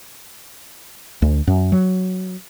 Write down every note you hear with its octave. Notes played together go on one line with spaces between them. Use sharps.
D2
F#2
F#3